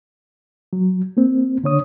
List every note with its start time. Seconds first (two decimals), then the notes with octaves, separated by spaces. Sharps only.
0.73 F#3
1.17 A#3 C4
1.64 D3 D4 C#5 D#6